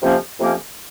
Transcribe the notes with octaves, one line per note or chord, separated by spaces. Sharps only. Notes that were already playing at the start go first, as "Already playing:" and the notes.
F2 C3 F3 A#3 C#4
F2 C3 F3 A#3 C#4